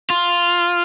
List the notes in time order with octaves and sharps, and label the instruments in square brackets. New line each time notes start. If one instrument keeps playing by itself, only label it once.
[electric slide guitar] F4